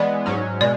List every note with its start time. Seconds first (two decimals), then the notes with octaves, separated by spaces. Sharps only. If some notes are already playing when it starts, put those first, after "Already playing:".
Already playing: E3 G#3 B3 D5
0.26 G#2 F#3 C#4
0.61 B2 G#3 D5